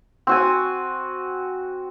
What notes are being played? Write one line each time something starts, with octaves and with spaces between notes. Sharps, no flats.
C4 F#4 G#5